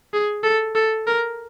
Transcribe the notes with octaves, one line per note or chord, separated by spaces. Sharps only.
G#4
A4
A4
A#4